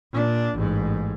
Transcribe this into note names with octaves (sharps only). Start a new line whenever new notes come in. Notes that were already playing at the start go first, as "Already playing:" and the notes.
A#2 D4
A1 G#2